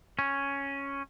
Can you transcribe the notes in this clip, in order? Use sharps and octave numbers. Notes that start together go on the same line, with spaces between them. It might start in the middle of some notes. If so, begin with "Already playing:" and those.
C#4